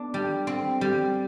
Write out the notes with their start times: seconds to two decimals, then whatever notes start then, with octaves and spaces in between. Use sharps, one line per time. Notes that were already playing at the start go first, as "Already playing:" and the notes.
Already playing: B3 D4
0.14 G3
0.47 C4
0.81 G3